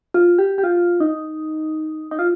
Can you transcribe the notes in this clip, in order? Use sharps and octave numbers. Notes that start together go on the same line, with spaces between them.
F4
G4
G4
F4
D#4
D#4
F4